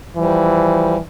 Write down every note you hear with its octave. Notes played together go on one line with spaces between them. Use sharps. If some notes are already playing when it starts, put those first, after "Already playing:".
E3 F3 G3